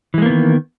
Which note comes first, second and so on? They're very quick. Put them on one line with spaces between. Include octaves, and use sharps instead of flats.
E3 G#3 A#3 B3 D#3